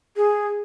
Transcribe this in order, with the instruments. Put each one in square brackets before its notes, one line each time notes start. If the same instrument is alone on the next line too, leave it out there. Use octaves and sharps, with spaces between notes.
[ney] G#4